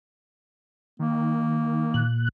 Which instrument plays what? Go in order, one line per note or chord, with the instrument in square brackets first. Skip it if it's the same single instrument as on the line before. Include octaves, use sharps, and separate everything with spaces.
[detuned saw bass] D#3 [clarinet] A#3
[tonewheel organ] A#2 F#6